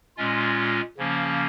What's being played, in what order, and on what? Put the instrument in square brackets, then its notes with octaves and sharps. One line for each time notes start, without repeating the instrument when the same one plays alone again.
[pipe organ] A#2 G#3 C#4 F4
C#3 F3 A#3 C#4